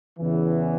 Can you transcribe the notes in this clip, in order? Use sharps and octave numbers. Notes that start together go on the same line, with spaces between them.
E2 C#3 E3